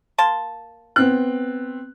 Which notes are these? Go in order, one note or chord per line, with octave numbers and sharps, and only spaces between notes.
A#3 A5 C6
B3 C4 F#6